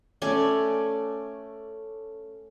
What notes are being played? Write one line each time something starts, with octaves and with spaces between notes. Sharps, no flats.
A3 C#4 D5 G#5